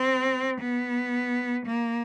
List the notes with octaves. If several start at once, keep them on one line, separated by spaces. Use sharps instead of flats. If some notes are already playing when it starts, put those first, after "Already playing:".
Already playing: C4
B3
A#3